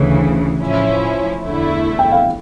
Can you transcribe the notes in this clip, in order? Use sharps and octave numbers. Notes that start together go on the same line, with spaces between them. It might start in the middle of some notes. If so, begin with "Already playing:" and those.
Already playing: D2 C#3 E3
A2 F3 C#4 E4
E2 D3 A3 E4
G5
F5